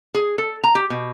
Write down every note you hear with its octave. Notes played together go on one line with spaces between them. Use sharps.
G#4
A4
A#5
G4
B2